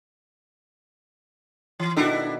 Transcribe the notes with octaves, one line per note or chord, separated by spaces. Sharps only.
E3
B2 D#3 D4 E4 A4